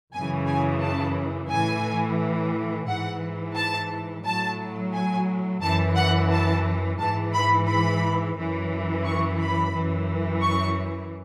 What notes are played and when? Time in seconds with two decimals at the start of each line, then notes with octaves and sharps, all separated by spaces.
0.13 F#2 C#3 E3 G#5
0.47 G#5
0.81 A5
1.50 A2 E3 G#5
2.87 G#2 E3 F#5
3.56 A5
4.25 A2 F#3 A5
4.93 G#5
5.62 F#2 E3 A5
5.96 F#5
6.31 A5
6.98 G#2 E3 A5
7.34 B5
7.67 B5
8.36 F#2 E3
9.05 C#6
9.40 B5
9.74 F#2 E3
10.42 C#6